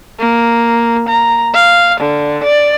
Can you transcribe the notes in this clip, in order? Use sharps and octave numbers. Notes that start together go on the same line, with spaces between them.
A#3
A#5
F5
D3
D5